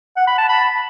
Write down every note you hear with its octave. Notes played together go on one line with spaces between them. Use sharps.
F#5
B5
A5
B5